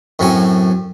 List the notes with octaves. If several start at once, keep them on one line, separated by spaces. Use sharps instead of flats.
F#2 A2 F#3 C4 C#5 G#5